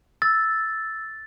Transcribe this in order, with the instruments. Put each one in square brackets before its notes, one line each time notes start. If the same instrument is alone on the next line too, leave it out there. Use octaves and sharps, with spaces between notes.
[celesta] E6 [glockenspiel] A6